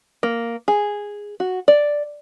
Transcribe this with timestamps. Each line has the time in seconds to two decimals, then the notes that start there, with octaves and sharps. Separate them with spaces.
0.23 A#3
0.68 G#4
1.40 F#4
1.68 D5